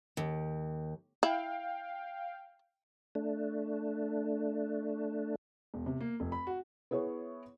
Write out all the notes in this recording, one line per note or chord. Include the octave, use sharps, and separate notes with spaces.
D#2
E4 F5 G5
A3 D4
E1
C3
A#3
F1
B5
F#4
B3 E4 G#4 C#5